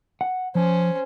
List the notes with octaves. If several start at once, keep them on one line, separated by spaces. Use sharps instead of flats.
F#5
F3 C#4 C5